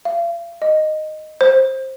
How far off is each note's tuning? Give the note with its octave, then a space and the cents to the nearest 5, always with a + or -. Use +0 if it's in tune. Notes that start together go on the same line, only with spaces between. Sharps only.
F5 -40
D#5 -10
C5 +15